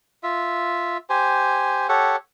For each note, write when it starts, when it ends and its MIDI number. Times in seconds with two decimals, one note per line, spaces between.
0.23 0.97 65
0.23 0.97 76
1.10 1.87 67
1.10 1.87 72
1.10 1.87 80
1.89 2.16 67
1.89 2.16 69
1.89 2.16 73
1.89 2.16 78